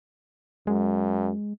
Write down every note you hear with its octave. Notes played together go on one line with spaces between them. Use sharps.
F#2 G#3